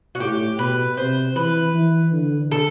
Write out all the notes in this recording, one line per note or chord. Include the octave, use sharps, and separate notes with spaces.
F#4
A2 G4
B2 B4
C3 C5
E3 B4
E3
D3
A4